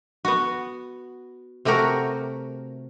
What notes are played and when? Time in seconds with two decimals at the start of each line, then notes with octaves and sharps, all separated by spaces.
0.25 B3 F#4
1.65 C3 A3 F#4 G4 A#4